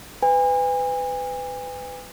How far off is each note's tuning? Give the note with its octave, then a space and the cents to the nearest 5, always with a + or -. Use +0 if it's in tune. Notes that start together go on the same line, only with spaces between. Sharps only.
B4 +25 G#5 -40